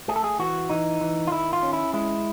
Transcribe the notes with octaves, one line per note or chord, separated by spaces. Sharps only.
A3 G#4
A4
G#4
E3 F#4
E3 D#4
E3
F4
D#3 E4
F4
C#4
E4
G#3 E4